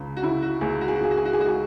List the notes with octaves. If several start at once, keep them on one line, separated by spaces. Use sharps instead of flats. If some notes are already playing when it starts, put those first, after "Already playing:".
Already playing: C#2 C#3
F#4
C#3 E4
F#4
C#2 G#4
F#4
G#4
F#4
C#2 G#4
F#4
G#4
F#4
G#4
G#3 F#4
G#4